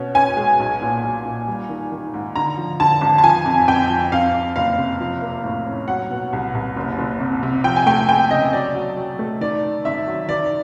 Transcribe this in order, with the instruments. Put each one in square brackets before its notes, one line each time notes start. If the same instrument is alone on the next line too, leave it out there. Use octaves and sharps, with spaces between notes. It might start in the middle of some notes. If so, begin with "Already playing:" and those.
Already playing: [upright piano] B2 C#4
C#4 G#5
G#3
B1
A#2
B1
A#2
G3
D#3
D#3
G#2
D3 A#5
F3
D3 A5
G#1
A5
F3 G#5
F2
F2 G5
F3
F2 F5
F2
F#1 F5
C3
F3
A#3
A2
C#4
F#3 F#5
B2
C2
C2
F#1
F#1
C3
C3
F3 G5
G#5
A3 G5
A3 G5
C#3 D#5
F#3 D5
F#3
F#3
A3
D#3 D5
D#3
G#1 E5
F#3
D#3 D5